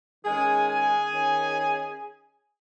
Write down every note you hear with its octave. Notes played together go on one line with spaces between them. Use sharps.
D#3 G#3 C#4 G#4 G#5
G#4 G#5
D#3 C#4